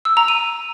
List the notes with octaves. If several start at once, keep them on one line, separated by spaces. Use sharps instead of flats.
E6
A#5
D#7